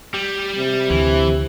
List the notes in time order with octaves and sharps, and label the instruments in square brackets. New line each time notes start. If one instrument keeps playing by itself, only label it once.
[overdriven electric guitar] G3
[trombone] C3
[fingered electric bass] D2 [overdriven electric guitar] E3